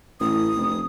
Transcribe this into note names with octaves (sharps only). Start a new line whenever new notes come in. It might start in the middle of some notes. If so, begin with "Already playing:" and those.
A1 D#6
F1